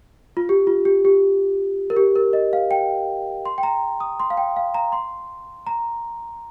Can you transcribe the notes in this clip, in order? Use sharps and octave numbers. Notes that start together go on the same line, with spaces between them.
F4
G4
F4
G4
G4
A#4
G4
A#4
D#5
F5
G5
C6
G5
A#5
D#6
C6
F5
G5
F5
A#5
C6
A#5